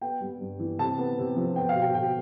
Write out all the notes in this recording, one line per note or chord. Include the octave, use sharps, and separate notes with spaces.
B3 G5
G3
G2
E3
C3 A5
B3
C3
F3
B3 G5
F5
B2
G5
B2 G5